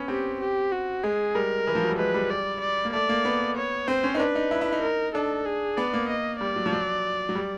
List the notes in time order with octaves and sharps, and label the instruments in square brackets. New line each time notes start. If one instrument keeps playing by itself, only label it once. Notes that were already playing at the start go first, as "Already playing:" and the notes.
Already playing: [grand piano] B3 C#4
[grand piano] C4 [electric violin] G4
[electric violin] G4
F#4
[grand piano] G#3 [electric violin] G#4
[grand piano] G3 [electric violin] A#4
[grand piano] E3
F3
F#3
G3
[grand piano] G#3 [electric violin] B4
[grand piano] G3
[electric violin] D5
D5
[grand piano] A#3
[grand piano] A3 [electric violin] D5
[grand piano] A#3
B3
[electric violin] C#5
[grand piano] C4 [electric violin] C5
[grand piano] C#4
D#4
[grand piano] D4 [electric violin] B4
[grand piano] D#4
E4
E4
D#4
[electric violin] A#4
[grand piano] D4 [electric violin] A4
[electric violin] G#4
[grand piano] B3 [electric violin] D5
[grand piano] A#3
[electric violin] D#5
[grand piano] G3 [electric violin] D5
[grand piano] F#3
F3
F#3
F#3
G3